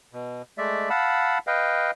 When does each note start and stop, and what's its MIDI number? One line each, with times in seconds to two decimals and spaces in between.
0.13 0.42 47
0.58 0.89 56
0.58 0.89 57
0.58 0.89 74
0.58 0.89 76
0.90 1.39 77
0.90 1.39 78
0.90 1.39 81
0.90 1.39 83
0.90 1.39 88
1.47 1.91 71
1.47 1.91 75
1.47 1.91 77
1.47 1.91 79